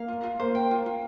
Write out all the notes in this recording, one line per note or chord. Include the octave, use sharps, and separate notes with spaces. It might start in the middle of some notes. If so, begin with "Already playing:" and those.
Already playing: A#3 F5
F4
F4
A#3 C5
G5
F4
F4